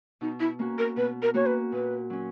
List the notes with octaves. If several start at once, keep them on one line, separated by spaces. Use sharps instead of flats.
B2 D#4
E4
A#3 C#4 F#4
A#4
B2 B4
A#4
A#3 C#4 F#4 C#5
B4
A#2 B4
F#3 C#4